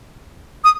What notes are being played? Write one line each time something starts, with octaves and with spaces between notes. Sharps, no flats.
D#6